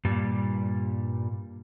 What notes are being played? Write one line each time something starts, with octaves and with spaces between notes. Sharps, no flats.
G2 A#2 G3